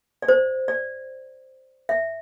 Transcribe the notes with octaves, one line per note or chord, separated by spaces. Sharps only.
D5
C5
D5
E5